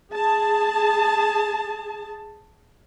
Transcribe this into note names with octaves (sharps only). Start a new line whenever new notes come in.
G#4 A5